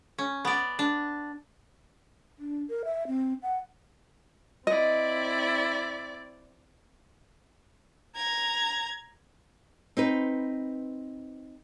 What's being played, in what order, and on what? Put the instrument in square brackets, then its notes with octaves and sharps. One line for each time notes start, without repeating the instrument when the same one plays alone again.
[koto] C#4
B3 D5
D4
[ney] D4
A#4
E5
C4
F#5
[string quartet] C4 E4 D5 [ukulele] D#5
[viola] A#5 [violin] G#6
[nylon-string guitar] C4 D#4 B4